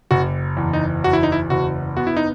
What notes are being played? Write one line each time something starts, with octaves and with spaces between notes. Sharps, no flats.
F#1 F#4
E2
D#4
E2 F#4
E4
D#4
E4
F#1 F#4
B3 F#4
E4
D#4